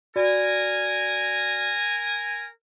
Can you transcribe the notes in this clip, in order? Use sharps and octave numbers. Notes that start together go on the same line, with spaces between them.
F#4 A#4 D5 G#5